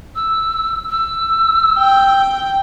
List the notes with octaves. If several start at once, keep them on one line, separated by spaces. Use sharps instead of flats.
E6
E6
G5